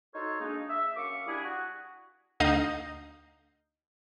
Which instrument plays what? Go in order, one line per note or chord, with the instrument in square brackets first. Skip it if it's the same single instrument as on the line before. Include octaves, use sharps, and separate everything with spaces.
[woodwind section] D#4 F#4 A4 C5 C#5
G#3 A#3 D4 D#4
E5
F#2 F5 C#6 D6
G3 D4 E4 G#4
F#4
[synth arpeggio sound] D2 D#4 F5 D#6 G6 C7